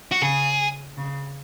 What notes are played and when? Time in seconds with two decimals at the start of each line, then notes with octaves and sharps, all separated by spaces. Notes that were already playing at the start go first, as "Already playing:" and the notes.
0.12 F#4
0.22 C#3 G#4
0.97 C#3